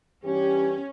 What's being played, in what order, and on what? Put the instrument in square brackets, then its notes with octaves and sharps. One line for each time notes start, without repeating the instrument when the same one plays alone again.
[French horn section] G2 E3 G4 [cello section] C#4